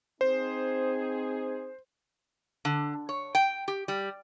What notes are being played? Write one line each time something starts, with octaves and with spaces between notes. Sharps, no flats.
C4 D#4 G#4 C5
D3
C#5
G5
G4
G3